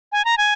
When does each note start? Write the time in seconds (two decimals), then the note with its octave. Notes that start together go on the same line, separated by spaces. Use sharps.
0.12 G#5
0.25 A#5
0.38 G#5